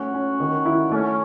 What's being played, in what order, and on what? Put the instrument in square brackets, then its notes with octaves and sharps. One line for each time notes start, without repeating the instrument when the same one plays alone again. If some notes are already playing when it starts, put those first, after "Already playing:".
Already playing: [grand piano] A3 C#4 [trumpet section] F#4
[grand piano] C#4
D#3
E4
[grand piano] A3 [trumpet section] C#4